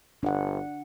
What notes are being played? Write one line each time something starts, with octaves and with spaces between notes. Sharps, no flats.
G1 D4 F#5